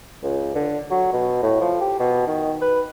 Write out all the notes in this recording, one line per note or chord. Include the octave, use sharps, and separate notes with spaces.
C#2
D3
F#3
B2
A2
F3
G4
B2
D#3
B4